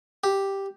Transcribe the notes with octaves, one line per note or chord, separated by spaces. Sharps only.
G4